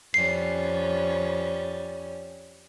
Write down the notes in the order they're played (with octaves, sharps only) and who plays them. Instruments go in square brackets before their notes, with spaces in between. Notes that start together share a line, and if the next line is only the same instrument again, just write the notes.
[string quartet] F2 G3 C#4 [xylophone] C7